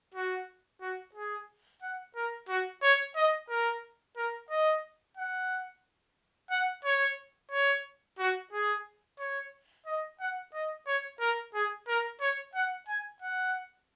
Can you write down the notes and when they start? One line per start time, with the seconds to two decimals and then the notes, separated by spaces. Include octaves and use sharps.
0.14 F#4
0.81 F#4
1.15 G#4
1.82 F#5
2.16 A#4
2.48 F#4
2.83 C#5
3.16 D#5
3.49 A#4
4.17 A#4
4.50 D#5
5.17 F#5
6.51 F#5
6.85 C#5
7.52 C#5
8.19 F#4
8.53 G#4
9.19 C#5
9.86 D#5
10.20 F#5
10.54 D#5
10.87 C#5
11.20 A#4
11.54 G#4
11.88 A#4
12.21 C#5
12.55 F#5
12.88 G#5
13.22 F#5